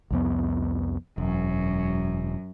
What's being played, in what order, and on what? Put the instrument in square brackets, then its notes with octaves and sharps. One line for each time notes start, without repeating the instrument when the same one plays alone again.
[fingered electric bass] C2 F2 B3
[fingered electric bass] E1 [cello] F#2